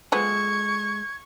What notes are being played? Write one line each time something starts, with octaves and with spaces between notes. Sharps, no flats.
F3 G#3 B3 G#4 A4 C#6 G#6